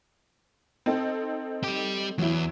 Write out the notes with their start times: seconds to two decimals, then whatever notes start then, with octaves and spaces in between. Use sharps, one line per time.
0.86 C4 D#4 A4
1.64 G3 G4
2.18 E2 F#3 E4